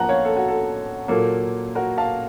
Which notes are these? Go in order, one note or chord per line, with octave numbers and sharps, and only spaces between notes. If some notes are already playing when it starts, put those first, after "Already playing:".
Already playing: F#2 F3 A#3 F#5 A5 A#5
C#5 F5
A4
F#4
A4
A#2 F#3 A#3 A4
F#4 A#4
F5 A5